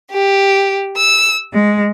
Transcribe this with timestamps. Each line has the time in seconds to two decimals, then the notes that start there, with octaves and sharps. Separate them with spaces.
0.11 G4
0.94 E6
1.52 G#3